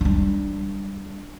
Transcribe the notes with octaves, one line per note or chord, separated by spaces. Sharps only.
G3 D4